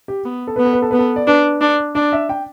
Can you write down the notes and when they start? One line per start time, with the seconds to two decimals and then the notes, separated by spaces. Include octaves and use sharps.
0.08 G4
0.25 B3
0.47 A4
0.56 B3 B4
0.65 A4
0.73 B4
0.82 A4
0.91 B3 B4
0.99 A4
1.16 D5
1.27 D4 B4
1.61 D4
1.95 D4 D5
2.13 E5
2.29 G5